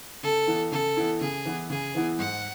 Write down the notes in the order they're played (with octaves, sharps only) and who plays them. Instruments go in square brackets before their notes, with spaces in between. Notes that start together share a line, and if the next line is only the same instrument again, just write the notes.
[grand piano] C#3 [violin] A4
[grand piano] E3 B3 E4
[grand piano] C#3 [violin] A4
[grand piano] E3 B3 E4
[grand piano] C#3 [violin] G#4
[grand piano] E3 B3 E4
[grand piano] C#3 [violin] G#4
[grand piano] E3 B3 E4
[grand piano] G#2 [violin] F#5